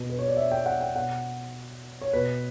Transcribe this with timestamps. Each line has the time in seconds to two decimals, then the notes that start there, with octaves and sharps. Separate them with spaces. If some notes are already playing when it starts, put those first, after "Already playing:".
Already playing: B2
0.09 B4
0.19 C#5
0.28 D5
0.37 E5
0.51 G5
0.66 F#5
0.81 G5
0.96 B2 F#5
2.01 C#5
2.13 B2 B4